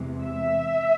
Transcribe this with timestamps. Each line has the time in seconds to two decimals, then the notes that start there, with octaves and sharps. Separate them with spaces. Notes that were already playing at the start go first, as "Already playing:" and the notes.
Already playing: E2 C3 E3 G#3
0.22 E5